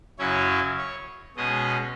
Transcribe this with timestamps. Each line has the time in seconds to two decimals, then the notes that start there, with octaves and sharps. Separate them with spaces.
0.18 F#2 C#3 F#3 C#4 E4 C#5
0.78 C#5
1.36 B2 G#3 C#4 D#5